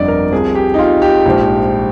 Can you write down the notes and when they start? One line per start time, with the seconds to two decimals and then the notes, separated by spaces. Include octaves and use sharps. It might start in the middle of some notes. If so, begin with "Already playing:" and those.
Already playing: G1 F2 D3 D5 D#5
0.08 A#4
0.32 C2 C3 F3 G#4
0.55 G4
0.74 D#4
0.79 F4
1.02 G4
1.26 A#1 G#2 F3